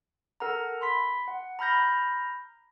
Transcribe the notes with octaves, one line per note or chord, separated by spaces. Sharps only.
A4 A#4 F#5 A#5
B5 C6 B6
F#5
A#5 B5 F6 G6 A#6